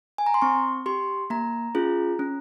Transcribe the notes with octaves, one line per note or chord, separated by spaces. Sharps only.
G#5
A#5
C6
C4 C#6
G4 C6
A#3 A#5
C#4 F4 G#4
C#4